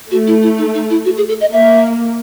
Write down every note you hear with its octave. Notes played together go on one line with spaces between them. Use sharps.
A3 F#4
E4
E4
D#4
D#4
E4
F#4
G#4
A4
D#5
A#3 E5